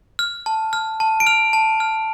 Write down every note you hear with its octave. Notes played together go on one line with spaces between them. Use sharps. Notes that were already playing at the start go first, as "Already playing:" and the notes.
F6
A5
F6
A5
D7
F6 F7
A5
F6